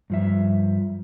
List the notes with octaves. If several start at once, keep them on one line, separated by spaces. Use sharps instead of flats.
G2 F3 E5